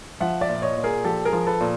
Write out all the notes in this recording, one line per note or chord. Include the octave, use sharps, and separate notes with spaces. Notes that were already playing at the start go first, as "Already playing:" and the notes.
F3 E5 F#5
D5 E5
A#2
C#5 D#5
A#2
G#4 A#4
F3 G4 A4
G#4 A#4
F3
A4 B4
A#2